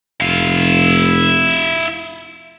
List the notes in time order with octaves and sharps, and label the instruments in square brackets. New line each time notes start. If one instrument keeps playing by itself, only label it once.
[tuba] F1 [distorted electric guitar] E4 F5